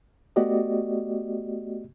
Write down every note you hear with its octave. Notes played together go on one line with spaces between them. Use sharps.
A3 B3 F#4 G4 D5 D#5